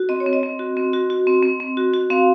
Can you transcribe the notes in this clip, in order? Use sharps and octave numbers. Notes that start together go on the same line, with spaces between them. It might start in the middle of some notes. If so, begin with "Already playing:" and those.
Already playing: F#4
C4 D#5
C#5
C4
D#5
C4
F#4
C4
F#4
F#4
C4
C4
C4
F#4
F#4
C4 F5